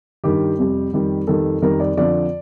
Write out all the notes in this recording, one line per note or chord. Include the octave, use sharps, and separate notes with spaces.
G2 D#3 G3 G4
F2 C3 G3
F2 D#3 G3
F2 D#3 G3 A4
F2 D#3 G3 A#4
D5
F2 D3 F3 D5